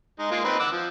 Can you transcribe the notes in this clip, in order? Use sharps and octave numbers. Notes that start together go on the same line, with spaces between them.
G#3 D#4
G#3 A#3 F4
C4 D#4 B4
F#5 D6 E6
F3